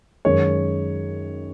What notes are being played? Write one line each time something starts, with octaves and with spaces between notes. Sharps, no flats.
F#2 D#3 G#3 C#5